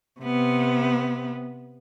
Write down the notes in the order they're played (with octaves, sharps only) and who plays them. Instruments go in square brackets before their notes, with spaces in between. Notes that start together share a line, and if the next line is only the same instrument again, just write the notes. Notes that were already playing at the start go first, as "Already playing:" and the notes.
[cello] C3 B3